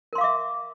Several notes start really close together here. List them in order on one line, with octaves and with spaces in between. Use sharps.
A#4 C6 F5 D6 E5